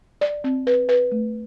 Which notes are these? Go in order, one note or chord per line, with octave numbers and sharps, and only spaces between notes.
D5
C4
B4
B4
A3